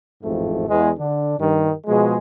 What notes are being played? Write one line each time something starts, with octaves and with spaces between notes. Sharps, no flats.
A1 F2 G#2 A3
E2 G#3
D3 D4
G2 D#3
B2 F3 G#3